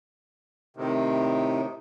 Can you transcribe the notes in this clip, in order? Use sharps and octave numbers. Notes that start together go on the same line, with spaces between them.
A2 C3 D#3